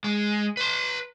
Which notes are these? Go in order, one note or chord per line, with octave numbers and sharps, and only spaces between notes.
G#3
B4 C6